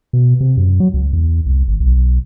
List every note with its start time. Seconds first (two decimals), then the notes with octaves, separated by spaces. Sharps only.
0.13 B2
0.40 C3
0.57 F#2
0.80 F#3
0.94 C#2
1.13 E2
1.46 C2
1.68 G#1
1.80 B1